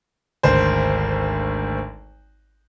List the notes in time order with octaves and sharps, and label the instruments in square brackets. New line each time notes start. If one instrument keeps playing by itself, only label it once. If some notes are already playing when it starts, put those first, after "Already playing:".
[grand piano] G#1 D2 C5